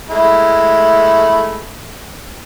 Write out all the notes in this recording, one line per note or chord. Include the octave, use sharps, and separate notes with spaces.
G#3 A3 E4